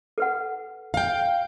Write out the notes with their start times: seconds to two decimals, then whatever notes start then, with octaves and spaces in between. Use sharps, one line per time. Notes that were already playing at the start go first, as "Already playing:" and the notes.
0.18 A4 B4 F#5
0.94 F5 G5